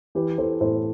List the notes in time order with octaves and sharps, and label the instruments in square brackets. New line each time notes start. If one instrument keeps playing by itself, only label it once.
[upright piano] E3 G4 B4
E3 A4 C5
A2 A4 C5